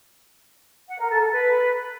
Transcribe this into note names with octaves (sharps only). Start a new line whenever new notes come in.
F#5
A#4
A4
A4
B4